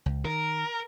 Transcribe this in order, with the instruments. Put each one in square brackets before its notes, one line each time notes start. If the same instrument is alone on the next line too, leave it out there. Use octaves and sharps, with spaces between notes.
[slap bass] C#2
[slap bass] D#3 [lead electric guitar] A#4